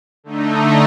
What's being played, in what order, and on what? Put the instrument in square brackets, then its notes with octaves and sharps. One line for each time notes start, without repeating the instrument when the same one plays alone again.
[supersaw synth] D3 A3 D#4